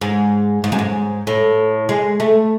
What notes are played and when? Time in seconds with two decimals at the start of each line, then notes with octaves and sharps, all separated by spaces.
0.01 G#2
0.64 G#2
0.72 F#2
0.79 G#2
1.27 A2
1.89 G#3
2.20 A3